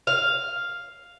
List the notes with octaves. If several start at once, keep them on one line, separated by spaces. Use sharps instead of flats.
F5